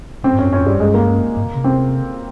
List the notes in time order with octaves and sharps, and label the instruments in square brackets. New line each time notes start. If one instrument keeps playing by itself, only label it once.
[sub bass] A#2 [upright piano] C4
[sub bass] G#2
[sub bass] G2 [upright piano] C#4
[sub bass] G2 [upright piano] C#4
[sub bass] F2
[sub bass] G2 [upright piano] G3
[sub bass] G2 [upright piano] G#3
[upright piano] A#3
[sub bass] G#2
A#2
C3
[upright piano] C4